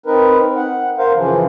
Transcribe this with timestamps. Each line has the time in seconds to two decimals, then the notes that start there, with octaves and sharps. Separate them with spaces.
0.06 C4 D#4 A#4 B4
0.56 F#5
0.98 A#4 C5 F5
1.15 F#2 C#3 E3 F3